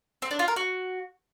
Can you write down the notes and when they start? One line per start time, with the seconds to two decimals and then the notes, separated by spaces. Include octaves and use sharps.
0.22 C4
0.31 D4
0.39 F4
0.48 A#4
0.56 F#4